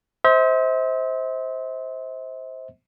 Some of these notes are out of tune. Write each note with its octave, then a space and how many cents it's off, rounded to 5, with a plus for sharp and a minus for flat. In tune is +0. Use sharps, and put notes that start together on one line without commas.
C5 +0 E5 -45